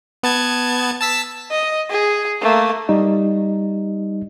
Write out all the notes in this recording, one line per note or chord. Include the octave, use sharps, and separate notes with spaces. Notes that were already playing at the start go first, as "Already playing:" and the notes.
B3 A5 G#6
A5 E6 B6
D#5
G#4
A3 A#3
G3 D#4 D#5